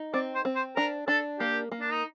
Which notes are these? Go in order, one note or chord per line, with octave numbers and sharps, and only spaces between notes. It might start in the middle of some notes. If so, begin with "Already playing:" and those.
Already playing: D#4
C4 D5
C5
C4
C5
D4 A#4
D4 A4
A#3 G4
A#3
D4
D#4